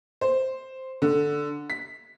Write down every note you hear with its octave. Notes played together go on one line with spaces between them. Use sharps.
C5
D3
B6